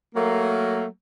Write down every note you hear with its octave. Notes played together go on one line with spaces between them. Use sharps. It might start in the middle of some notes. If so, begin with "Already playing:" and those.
F#3 A3 A#3